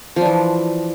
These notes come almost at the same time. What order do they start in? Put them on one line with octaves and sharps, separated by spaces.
F3 D4 E3